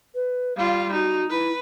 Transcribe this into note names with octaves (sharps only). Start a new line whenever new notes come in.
B4
G3 F4 F5
D#4 F#4
E4 B4